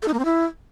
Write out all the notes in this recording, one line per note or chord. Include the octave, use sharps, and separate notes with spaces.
A4
D#4
A#3
C4
E4